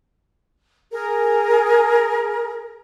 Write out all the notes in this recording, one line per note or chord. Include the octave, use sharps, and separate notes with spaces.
G#4 A#4